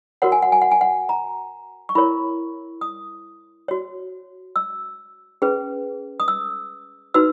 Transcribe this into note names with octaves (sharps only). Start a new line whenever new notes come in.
F#4 A#4 C#5 F#5
G#5
F#5
G#5
F#5
G#5
F#5
A#5
C#6
E4 A#4 C#5 B5
D#6
F#4 C#5
E6
C#4 G#4 B4
D#6
E6
D#4 F#4 B4 E6